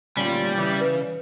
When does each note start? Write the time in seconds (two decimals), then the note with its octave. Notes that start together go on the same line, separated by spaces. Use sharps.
0.17 D2 A#2 G3 C#4 F4
0.58 C#3 E3
0.80 B4